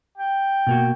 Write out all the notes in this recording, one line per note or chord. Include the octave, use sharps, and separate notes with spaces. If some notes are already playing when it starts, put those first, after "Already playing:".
G5
B2 A#3 F#4